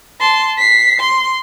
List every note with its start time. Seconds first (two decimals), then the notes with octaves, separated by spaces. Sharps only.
0.20 A5 C6
0.58 B6 C7
1.00 C6